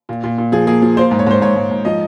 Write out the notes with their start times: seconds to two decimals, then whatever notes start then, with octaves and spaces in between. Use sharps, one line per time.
0.09 A#2
0.24 A#2
0.38 A#2
0.52 F3 G#4
0.67 A#3 G#4
0.82 F3
0.97 A#3 C5
1.11 G#2
1.19 C#5
1.26 G#2 C5
1.42 G#2 C#5
1.56 G#2
1.71 G#2
1.85 F3 D#5